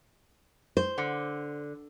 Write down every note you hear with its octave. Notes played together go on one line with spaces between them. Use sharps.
C5
D3